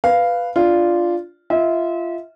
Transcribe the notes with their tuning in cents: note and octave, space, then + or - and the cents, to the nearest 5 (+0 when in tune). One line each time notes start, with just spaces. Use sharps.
B4 +0 F5 -5
D4 +0 F4 -5 D5 +0
F4 -20 E5 -35